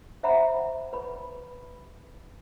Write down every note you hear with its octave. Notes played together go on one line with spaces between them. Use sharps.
C5 E5 F#5 A#5 B5
B4 B5